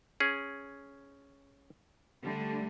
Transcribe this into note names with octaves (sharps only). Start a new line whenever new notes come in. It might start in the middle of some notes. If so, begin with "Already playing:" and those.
C#4 G#4
D3 G3 A3